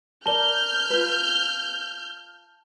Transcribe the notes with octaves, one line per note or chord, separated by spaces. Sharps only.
A#4 D5 A5 F6 G6 G7
F4 B4